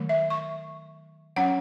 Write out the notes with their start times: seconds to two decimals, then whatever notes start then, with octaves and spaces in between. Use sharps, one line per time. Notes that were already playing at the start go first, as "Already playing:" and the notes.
Already playing: D#3 F#3 A3
0.09 E5
0.30 C#6
1.36 F#3 C#4 F#5